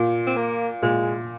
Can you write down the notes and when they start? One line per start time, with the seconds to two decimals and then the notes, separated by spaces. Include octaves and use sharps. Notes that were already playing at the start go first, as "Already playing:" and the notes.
Already playing: A#2
0.27 C4
0.37 A#3
0.82 A#2 G#3